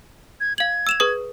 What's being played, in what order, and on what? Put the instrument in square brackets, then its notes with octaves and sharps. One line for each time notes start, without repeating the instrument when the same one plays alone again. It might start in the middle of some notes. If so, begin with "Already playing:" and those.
[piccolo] G#6
[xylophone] F5 F#7 [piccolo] G#6
[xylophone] E6 E7 F7
G#4 B4 D#6